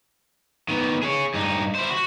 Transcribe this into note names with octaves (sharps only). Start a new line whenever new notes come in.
D#3 B3
G#4 C#5
G2 D#4
E4 C5
F#4